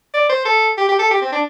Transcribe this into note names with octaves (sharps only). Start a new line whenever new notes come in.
D5
C5
A4
G4
G4
A4
G4
C4
D4